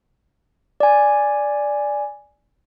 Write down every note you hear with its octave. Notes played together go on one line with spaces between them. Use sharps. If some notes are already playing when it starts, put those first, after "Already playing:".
D5 G#5